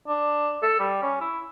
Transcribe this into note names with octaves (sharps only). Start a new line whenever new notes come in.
D4
A4
G3
C#4
E4